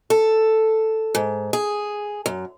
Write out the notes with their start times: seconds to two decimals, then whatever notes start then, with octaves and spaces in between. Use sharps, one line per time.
0.10 A4
1.15 G#2
1.53 G#4
2.26 F#2